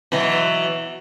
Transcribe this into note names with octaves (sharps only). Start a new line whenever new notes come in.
B2 E3 F#3